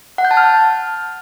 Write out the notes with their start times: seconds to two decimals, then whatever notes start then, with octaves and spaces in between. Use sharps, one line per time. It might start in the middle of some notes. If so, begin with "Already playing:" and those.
0.18 F#5
0.25 G6
0.31 A5
0.37 F6